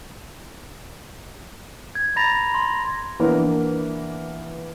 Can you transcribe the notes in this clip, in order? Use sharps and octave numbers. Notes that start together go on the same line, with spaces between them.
G#6
A#5 B5 A6 A#6 F7
C6
E3 A#3 B3 D4 A#4